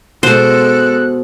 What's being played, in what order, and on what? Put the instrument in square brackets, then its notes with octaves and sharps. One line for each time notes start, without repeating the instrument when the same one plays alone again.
[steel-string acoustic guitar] B2 [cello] G#3 A4 [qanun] C5 [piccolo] F#6